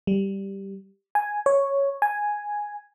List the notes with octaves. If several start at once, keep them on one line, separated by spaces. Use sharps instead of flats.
G3
G#5
C#5
G#5